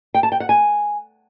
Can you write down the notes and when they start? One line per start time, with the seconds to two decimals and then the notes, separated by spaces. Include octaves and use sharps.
0.14 G5
0.23 A5
0.32 G5
0.40 F#5
0.49 G#5